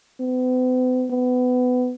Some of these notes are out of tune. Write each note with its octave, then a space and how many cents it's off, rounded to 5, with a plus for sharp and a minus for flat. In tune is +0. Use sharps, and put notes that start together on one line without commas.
B3 +45
B3 +25